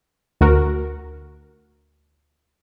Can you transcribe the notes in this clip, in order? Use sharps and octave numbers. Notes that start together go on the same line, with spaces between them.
D2 F#4 A#4